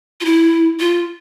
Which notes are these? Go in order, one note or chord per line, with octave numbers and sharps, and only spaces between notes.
F4
E4
F4